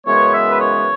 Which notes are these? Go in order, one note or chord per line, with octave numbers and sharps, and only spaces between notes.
F#2 C#3 E3 G#3 B3 C#5
E5
B4
C#5